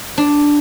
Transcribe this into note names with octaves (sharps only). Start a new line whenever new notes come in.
D4